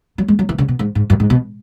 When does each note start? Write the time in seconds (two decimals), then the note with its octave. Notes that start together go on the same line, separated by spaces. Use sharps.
0.18 F#3
0.28 G#3
0.39 F#3
0.49 E3
0.58 C#3
0.68 B2
0.79 G#2
0.95 G#2
1.10 F#2
1.20 G#2
1.30 B2